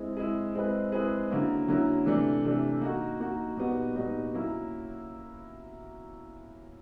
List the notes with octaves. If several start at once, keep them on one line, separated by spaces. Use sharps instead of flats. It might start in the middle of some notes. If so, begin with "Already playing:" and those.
Already playing: G#3 C4 E4
G#3 C4 E4
G#3 C4 E4 G#4 B4
G#3 C4 E4 G#4 B4
D3 F#3 A#3 C#4 E4
D3 F#3 A#3 C#4 E4
C3 E3 A3 D4
C3 E3 A3 D4
A#3 D#4 F#4
A#3 D#4 F#4
A#2 G3 B3 D#4 F#4
A#2 G3 B3 D#4 F#4
F#3 A#3 C#4 E4